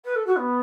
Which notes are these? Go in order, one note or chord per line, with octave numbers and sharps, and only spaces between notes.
B4
A4
F#4
B3